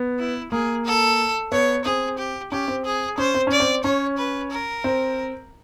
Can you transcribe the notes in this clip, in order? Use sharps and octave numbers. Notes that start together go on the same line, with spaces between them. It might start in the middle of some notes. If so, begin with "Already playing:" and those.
Already playing: B3
E4
A#3 G#4
A4
B3 C#5
C4 G#4
G4
C#4 G4
C4
G#4
C#4 C5
C4
C#4 D5
C4
C#4 C#5
B4
A#4
C4